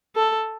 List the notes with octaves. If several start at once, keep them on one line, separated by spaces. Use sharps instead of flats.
A4